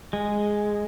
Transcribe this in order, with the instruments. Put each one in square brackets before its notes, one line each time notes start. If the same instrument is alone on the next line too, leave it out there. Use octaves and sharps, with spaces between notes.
[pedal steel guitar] G#3